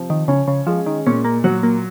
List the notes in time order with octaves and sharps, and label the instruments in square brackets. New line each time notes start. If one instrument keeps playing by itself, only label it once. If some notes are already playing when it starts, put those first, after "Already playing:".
Already playing: [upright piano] C3 F3
[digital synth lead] D#3
[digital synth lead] C#3 [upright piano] C#4
[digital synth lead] C#3
[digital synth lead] F3 [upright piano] G#3
[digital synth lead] D#3
[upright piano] A#2 [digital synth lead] C#4
[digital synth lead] A#3
[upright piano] F#3 [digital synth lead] F#4
[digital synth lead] A#3